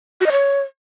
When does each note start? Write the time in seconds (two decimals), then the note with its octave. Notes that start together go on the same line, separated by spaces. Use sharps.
0.21 F#4
0.26 D#5
0.32 C#5